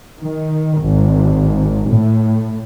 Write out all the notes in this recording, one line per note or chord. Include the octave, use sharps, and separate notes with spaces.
D#3
G#1
A2